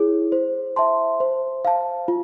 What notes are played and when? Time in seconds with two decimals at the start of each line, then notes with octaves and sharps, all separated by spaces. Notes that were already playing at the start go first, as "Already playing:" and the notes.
Already playing: E4 G#4 C#5
0.32 C5
0.76 E5 A5 C6
1.20 C5
1.65 F5 A5
2.08 F4